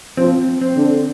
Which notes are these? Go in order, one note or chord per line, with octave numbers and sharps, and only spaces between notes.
F3 C4
C4
D3